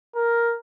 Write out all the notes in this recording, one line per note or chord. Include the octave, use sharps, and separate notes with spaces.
A#4